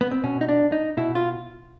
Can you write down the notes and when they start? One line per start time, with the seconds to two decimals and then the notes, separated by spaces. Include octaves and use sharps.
0.01 B3
0.11 C4
0.24 B2 C#4
0.41 D#4
0.48 D4
0.72 D#4
0.97 B2 E4
1.15 F4